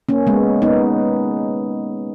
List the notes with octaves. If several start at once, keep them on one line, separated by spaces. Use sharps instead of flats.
A#3 C#4
G#3 B3
B3 D#4